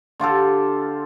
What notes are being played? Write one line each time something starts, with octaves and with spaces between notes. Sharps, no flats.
D3 F4 G4 A4